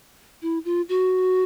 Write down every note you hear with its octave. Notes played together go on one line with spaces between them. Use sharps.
E4
F4
F#4